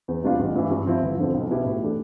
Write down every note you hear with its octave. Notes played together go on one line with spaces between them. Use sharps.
E2
C3 G3 D4 F4
A1
G2 E3
G2
F3 C4 E4
G1
F2 D3 F3
B1
B2 B3 E4 G4
A2
E3 A3 D4 G4